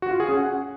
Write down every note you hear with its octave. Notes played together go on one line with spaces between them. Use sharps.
F#4
F4
G#4
C#4
F#5